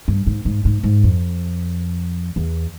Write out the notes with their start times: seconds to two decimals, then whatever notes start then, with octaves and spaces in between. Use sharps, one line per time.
0.08 G2
0.27 G#2
0.45 G#2
0.65 G#2
0.83 G#2
1.04 F2
2.36 E2